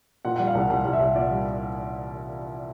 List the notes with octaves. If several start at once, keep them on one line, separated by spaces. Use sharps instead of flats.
A#2 F#5
F#5
G3
F5
C2 F#5
C2 F#5
C2
E5
C2
A#2 D5
G3